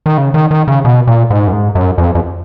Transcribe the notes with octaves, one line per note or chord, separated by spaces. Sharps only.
D#3
C#3
D#3
D#3
C#3
B2
A#2
G#2
F#2
G#2
F#2
F2
F2